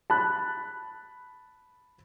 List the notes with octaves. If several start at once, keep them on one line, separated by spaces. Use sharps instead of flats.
A5 B5 F#6